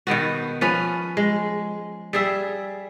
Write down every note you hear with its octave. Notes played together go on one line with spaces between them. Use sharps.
B2 D#3 B3 F#4
F3 C#4 B4
G#3
G3 G#4 E5